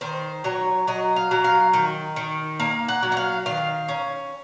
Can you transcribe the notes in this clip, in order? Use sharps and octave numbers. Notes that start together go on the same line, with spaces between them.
D#3 C5
F#3 C#5
F#3 D#5
F5
F#3
F5
D#3
D#3
A#3 F5
F#5
F#3
F#5
F5
D#3 F5
C#4